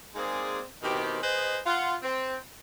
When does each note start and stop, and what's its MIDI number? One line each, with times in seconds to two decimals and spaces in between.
0.15 0.62 56
0.15 0.62 58
0.15 0.62 60
0.15 0.62 63
0.15 0.62 68
0.15 0.62 74
0.83 1.19 47
0.83 1.19 51
0.83 1.19 60
0.83 1.19 64
0.83 1.19 67
1.22 1.59 68
1.22 1.59 71
1.22 1.59 72
1.22 1.59 75
1.66 1.96 65
1.66 1.96 78
2.03 2.38 60